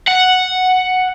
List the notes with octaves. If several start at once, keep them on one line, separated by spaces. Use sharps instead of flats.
F#5